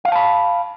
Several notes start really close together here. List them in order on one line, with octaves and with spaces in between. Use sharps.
F5 F#5 A5 B5